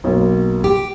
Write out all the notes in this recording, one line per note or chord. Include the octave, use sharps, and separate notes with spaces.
B1 A#3
G4